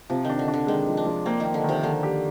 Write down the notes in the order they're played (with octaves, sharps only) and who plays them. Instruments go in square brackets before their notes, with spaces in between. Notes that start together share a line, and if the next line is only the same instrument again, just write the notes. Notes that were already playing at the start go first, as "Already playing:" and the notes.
[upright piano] C3 [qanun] F3
[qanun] D#3 [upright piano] D4
[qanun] D3
[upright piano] D4
[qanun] D3
[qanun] D#3 [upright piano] G#3
[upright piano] F3
[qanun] D4
[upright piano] F3
[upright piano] A#3 [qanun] C4
[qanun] D#3 [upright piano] A#3
[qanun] D3
[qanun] C3 [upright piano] D#3
[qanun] D3 [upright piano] D#3
[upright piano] G4